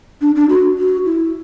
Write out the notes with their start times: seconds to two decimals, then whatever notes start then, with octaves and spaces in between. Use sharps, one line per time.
0.21 D4
0.36 D4
0.49 F#4
0.78 F#4
1.06 E4